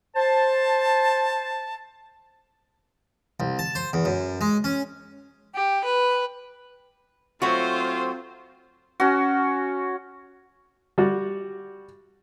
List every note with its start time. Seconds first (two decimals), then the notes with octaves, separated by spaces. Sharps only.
0.16 C5 A5
3.40 C2
3.59 A5
3.75 C5
3.93 E2
4.05 F#2
4.41 G#3
4.64 C#4
5.55 G4
5.84 B4
7.42 F#3 A3 C4 F4 F#4 C5
9.00 C#4 F#4
10.98 G3 F#4